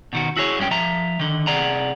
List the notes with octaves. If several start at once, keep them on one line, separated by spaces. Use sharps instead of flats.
B2 D#3 F#4
E4 F#4 G#4 C#5
G2 G#3 C#4 G5
F3 E5 A#5
D3 D#3
C3 G#4 D5 F#5 A#5